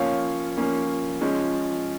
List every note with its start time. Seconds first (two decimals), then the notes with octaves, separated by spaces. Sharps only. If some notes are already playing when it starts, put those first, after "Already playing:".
Already playing: F3 A#3 C#4 C#5 F5
0.57 F3 A#3 C#4
1.21 F3 G#3 C#4